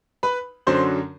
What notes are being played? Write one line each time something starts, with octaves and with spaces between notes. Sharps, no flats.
B4 B5
F#2 D3 F#3 C5 C6